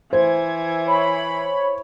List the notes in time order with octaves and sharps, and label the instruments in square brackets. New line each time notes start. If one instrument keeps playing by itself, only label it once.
[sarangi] E3 [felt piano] C5 [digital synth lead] G#6
[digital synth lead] C#5 [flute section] B5